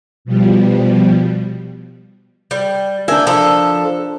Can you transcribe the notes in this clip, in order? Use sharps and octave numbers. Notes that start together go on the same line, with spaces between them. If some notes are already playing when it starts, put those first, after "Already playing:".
B2 F3 G3
G3
D4 A#4 E5 G5 G#5
F3 A4